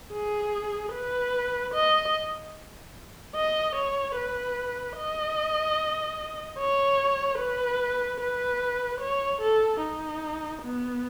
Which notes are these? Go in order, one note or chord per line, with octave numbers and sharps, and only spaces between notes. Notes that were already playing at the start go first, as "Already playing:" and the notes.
G#4
B4
D#5
D#5
C#5
B4
D#5
C#5
B4
B4
C#5
A4
D#4
B3